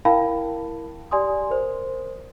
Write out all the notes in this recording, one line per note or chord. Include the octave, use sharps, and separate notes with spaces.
E4 A#4 F5 G5 A5 B5
G4 D5 G#5 C6 D#6
A#4 C5